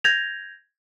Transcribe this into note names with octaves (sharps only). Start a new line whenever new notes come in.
G6 G#6 A#6 F7